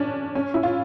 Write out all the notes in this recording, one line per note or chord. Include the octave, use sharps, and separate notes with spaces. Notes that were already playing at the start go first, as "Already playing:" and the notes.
Already playing: C#4 D4
C#4
E4
F4